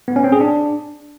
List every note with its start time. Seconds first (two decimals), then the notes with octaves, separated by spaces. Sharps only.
0.08 B3
0.16 C#4
0.24 C4
0.32 G#4
0.41 D4